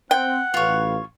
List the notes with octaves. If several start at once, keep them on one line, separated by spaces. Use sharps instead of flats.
C4 F#5 G5
A1 F4 B4 C#5 F5